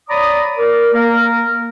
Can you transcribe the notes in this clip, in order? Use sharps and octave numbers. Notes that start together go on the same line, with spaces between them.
C#5 D5 A#5 B5 D6 D#6
A#4 D5
A#3 A#4